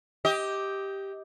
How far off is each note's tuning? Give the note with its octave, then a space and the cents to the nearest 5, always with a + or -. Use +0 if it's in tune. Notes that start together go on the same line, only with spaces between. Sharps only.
G4 +0 D#5 +25